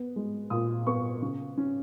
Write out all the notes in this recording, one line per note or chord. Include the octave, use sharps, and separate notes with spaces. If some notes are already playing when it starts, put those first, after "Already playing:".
Already playing: B3
G#3
A#2 D#6
B3 C#6
C#3
C#4